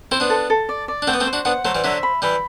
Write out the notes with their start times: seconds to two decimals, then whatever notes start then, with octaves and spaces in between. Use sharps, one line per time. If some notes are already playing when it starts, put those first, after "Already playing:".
0.11 C4 E4 C5
0.20 B3 D4
0.30 A4
0.50 A4
0.69 D5
0.88 D5
1.02 D4
1.07 A3 C4 F#5
1.14 B3
1.20 A3 C4
1.27 C5
1.33 D4 F#4
1.45 B3 D4 F#5
1.65 F#3 A3 C5
1.75 E3 G3
1.84 D3 F#3 E5
2.03 B5
2.22 E3 G3 B5